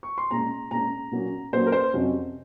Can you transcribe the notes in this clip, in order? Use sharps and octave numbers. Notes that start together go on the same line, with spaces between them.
C#6
C6
A#2 G#3 C#4 A#5
A#2 G#3 C#4 A#5
A#2 F#3 A#3 C#4
A#2 F#3 A#3 C#4 C5
A#4
C5
F2 C3 F#3 C#4